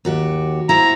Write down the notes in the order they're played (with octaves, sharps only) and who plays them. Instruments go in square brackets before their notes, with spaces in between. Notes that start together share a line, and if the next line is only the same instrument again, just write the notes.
[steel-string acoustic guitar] D#2 F#4 G4
[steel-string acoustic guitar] E4 F#4 C5 [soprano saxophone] A#5